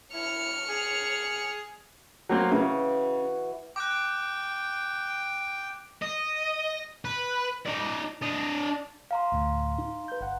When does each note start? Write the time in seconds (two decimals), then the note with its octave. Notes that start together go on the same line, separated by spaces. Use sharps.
0.14 E4 F6 C#7
0.69 G#4
2.29 F#3 A#3 C4
2.52 C#3 E3 F#4
3.76 G5 D6 F#6
6.02 D#5
7.05 B4
7.66 D#4 D5
8.22 D4 D#5
9.11 F5 A#5 C6
9.32 D2 A2
9.78 D#4
10.08 B4 G6
10.21 G1 F#5